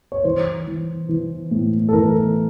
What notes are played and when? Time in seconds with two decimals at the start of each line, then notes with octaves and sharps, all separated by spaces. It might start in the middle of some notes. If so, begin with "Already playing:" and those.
0.12 C#5
0.24 E3 C5
0.67 E3
1.09 E3
1.51 A2
1.89 A4
1.93 E3 A#4